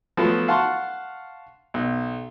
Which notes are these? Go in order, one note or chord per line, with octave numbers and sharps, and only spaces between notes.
F3 F#3 A3 B3
F5 F#5 A5 C6 C#6
B1